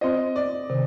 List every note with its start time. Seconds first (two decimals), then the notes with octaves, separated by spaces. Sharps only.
0.01 C4 F4 C5 D#5
0.36 D5
0.70 C3 D#3